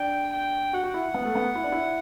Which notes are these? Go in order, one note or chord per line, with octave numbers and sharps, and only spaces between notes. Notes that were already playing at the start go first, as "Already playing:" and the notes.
Already playing: D4 G5
G5
F#4 F#5
F#4
E4
B3
A3
B3
E4
D4
E4